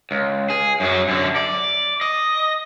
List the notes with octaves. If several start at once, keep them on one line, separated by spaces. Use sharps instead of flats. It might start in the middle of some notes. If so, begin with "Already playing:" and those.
C#2
G#4
F#2 F#3
F#2 D3
D5
D#5